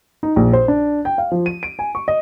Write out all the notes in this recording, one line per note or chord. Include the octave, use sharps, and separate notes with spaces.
D#4
A#1
C5
D4
G5
F5
F3
D#7
D7
G#5
C#6
D#5